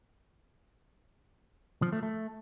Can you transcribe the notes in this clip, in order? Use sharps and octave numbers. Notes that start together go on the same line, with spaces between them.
F3
A3
A3